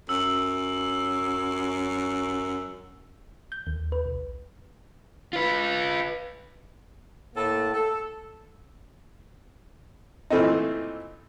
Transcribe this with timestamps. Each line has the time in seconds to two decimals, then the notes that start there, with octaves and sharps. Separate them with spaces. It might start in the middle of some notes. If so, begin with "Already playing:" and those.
0.09 F#2 E6
3.52 G6
3.67 D#2
3.92 B4
4.06 B1
5.33 F4 B4
7.35 A2 A#3 A4 A5
7.73 A4
10.30 A#2 E3 A3 C4 D#4